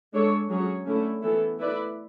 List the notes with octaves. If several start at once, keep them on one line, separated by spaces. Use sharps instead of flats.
G#3 D4 A4 C#5
F#3 C#4 G#4 C#5
D3 A3 C#4 E4 A4
E3 B3 E4 A4
A3 E4 B4 D5